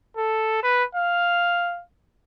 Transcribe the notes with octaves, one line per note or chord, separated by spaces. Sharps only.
A4
B4
F5